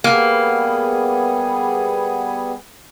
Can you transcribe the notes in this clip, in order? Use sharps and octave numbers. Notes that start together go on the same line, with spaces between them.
G3 A#3 B3 G#4